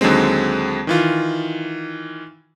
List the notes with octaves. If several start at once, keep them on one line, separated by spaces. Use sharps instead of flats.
D#2 D3 F#3 G#3 C4
D#3 E3 F4